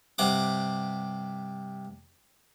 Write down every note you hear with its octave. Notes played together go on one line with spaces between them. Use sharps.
G2 C3 F#5 D6